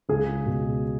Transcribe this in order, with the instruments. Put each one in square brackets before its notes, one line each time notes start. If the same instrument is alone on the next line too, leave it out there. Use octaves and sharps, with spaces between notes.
[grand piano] C#2 G#4
B2